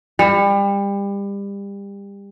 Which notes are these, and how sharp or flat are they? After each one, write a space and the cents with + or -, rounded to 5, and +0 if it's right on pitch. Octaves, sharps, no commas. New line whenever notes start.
G3 +30